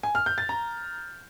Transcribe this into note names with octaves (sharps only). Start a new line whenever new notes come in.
G#5
F6
G6
A6
A#5